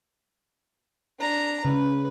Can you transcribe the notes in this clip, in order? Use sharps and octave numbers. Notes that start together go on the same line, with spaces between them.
D4 A#5
C#3 B4